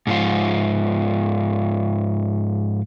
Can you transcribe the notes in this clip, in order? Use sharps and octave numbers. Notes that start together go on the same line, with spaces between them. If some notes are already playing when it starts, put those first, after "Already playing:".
G#2 F3 F4